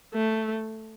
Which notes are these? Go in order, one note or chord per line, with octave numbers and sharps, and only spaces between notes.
A3